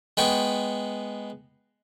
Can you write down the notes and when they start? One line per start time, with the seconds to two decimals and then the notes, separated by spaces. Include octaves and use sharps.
0.17 G#3 B3 G5 C#6